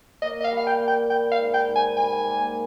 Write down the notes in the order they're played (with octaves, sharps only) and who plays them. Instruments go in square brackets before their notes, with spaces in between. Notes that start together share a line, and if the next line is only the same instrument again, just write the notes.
[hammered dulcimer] A#3 [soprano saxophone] D#5
[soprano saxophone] D#5
F5
[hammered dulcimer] G3
[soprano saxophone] F5
G5
[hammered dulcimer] A#3
[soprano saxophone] G5
[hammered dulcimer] G3 [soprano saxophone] G5
[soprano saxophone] F5
[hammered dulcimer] G#2
[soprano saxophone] G5
[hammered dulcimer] G#2
[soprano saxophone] G#5
[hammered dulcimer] G3 [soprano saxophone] G#5
[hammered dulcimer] A#3